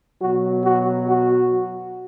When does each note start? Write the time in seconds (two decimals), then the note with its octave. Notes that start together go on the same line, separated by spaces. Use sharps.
0.21 B2 F#3 F#4
0.65 F#4
1.08 F#4